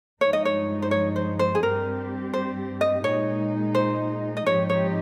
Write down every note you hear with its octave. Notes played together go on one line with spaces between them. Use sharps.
G2 F3 G#3 D#4 C#5
D#5
C#5
C5
C#5
C5
C5
G#4
G2 G3 C4 G4 A#4
C5
D#5
A#2 G#3 D#4 C#5
C5
D#5
G#2 F3 C4 D#4 G4 C#5
C#5